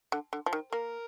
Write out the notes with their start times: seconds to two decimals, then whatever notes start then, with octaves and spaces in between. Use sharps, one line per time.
0.12 D3
0.33 D3
0.46 F3
0.53 D#3
0.72 A#3 A#4